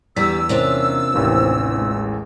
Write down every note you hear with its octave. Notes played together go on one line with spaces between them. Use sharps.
E2 D3 G3 G#4 D5 E6 B6
C3 A#3 C#4 D4 F4
A1 D#2 E3 A3 A#3 C4
G#3